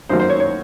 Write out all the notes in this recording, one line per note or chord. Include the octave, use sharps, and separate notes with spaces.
F#2 D#3 F#3 A#3 C5
C5
C#5
C#5